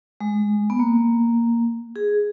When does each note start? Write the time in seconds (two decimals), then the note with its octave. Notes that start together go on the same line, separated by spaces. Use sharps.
0.20 G#3
0.70 B3
0.79 A#3
1.96 G#4